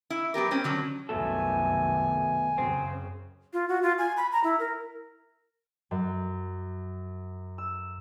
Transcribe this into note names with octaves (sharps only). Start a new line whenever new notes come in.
E4
F#3 B3 G4 A#4
G3 C4 C#4
D3 F#3 C#4
C2 F#2 B2 D#3 A3 A4 G#5
F#2 C#3 C4
F4
F#4
F4
G#5
B5
A#5
E4
A#4
F#2
E6